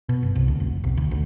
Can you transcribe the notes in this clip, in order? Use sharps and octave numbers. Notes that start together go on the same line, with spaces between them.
B2
G1
C2
D2
F1
B1
D2
D2